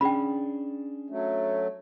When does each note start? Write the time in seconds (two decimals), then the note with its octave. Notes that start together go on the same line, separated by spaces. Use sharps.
0.01 C#4 D4 G#4 G5 B5
1.10 F#3 A3